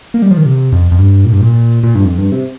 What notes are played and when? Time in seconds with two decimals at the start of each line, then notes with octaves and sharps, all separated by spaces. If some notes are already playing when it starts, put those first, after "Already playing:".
0.14 A#3
0.22 G3
0.31 F3
0.37 D#3
0.46 C3
0.72 F2
0.91 F2
0.99 G2
1.25 A#2
1.32 G2
1.41 A#2
1.83 A#2
1.95 G2
2.05 F2
2.18 G2
2.32 C3